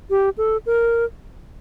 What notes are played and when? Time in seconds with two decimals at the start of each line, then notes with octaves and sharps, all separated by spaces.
0.10 G4
0.38 A4
0.66 A#4